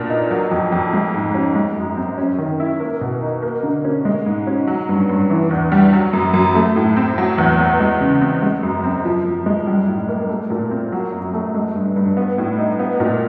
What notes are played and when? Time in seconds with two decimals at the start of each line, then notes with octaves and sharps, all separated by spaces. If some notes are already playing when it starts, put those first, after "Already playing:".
Already playing: A#2 B3 D4
0.10 D#4
0.31 F#3
0.51 F2
0.72 F2
0.93 G#3
1.14 G#2
1.35 C#4
1.56 G#3
1.76 F#2
1.97 C4
2.18 C#4
2.38 D#3
2.60 E4
2.80 A#3
3.01 B2
3.22 D#4
3.43 A#3
3.63 D3
3.84 C#4
4.05 G#3
4.26 G#2
4.47 C#4
4.67 F#3
4.89 G2
5.09 G2
5.30 E3
5.50 E2
5.72 G3
5.93 F#3
6.13 F#2
6.34 F#2
6.55 A3
6.76 A2
6.97 C4
7.18 F#3
7.38 E2
7.59 B3
7.80 G#3
8.01 C#3
8.21 C4
8.42 G#3
8.63 F#2
8.84 C4
9.05 F3
9.25 F#2
9.46 G#3
9.67 G3
9.88 A2
10.09 A#3
10.29 A3
10.50 A#2
10.71 C4
10.92 F#3
11.12 F#2
11.33 A3
11.54 G#3
11.76 G2
11.96 G2
12.17 B3
12.38 A2
12.58 D#4
12.79 B3
13.00 A#2